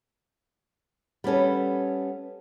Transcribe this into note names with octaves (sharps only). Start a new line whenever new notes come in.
G3 B3 C#4 A4